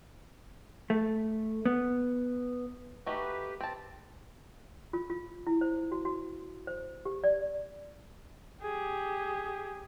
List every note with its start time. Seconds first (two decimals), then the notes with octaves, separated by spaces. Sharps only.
0.90 A3
1.65 B3
3.06 A3 D#4 F#4 G4 B4
3.61 C4 A5
4.93 F4
5.10 F4
5.47 E4
5.61 C5
5.92 F#4
6.05 F#4
6.67 C5
7.05 G4
7.24 D5
8.63 G4 G#4